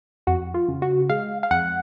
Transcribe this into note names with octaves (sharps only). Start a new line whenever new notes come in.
F2 F#4
F4
C#3
F#4
G#3 F5
F5
F2 F#5